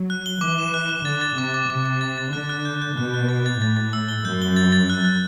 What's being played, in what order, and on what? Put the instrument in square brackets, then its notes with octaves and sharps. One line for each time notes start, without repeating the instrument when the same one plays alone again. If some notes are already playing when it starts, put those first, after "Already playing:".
Already playing: [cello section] F#3
[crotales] F#6
G7
[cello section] E3 [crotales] D6
[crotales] E7
F#6
F#6
[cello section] D3 [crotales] A6
[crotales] A6
[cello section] C3 [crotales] D6
[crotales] D6
[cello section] C3 [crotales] D6
[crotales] D6
A6
A6
[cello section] D3 [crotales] F#6
[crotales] F#6
G6
G6
[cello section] B2 [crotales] F#6
[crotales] F#6
A6
A6
[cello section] A2 [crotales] A6
[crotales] A6
E6
G7
[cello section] F#2 [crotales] G6
[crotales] G7
A6
A6
F#6
F#6